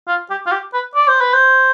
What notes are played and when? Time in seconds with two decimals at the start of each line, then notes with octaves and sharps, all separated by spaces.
0.08 F4
0.30 G4
0.46 F4
0.52 G4
0.73 B4
0.95 D5
1.08 C5
1.21 B4
1.34 C5